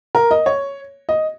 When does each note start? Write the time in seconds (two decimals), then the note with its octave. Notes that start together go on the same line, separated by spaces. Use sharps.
0.15 A#4
0.31 D#5
0.46 C#5
1.09 D#5